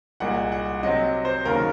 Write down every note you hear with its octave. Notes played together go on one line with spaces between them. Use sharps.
C2 A#2 G#3 F#5
F#5
C3 F#3 C4 D#5
C5
D#2 C#3 F#3 A#4